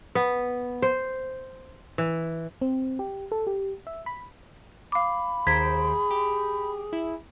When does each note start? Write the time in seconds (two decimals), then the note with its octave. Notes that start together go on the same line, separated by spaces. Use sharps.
0.15 B3
0.82 C5
1.98 E3
2.61 C4
2.99 G4
3.32 A4
3.47 G4
3.87 E5
4.06 B5
4.92 F5 B5 D6
5.47 D#2 G#4 C5 A#5 G#6 B6 D7
6.11 G4
6.93 E4